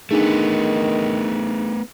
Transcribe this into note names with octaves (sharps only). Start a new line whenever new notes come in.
D#3 A3 B3 D4 D#4 G#4